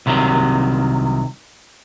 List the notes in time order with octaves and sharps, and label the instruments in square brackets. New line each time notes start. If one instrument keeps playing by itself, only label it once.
[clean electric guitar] C2 C3 D#3 F#3